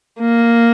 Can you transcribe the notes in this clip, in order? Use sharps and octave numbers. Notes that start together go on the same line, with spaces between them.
A#3